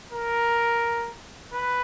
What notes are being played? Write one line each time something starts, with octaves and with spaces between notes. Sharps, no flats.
A#4
B4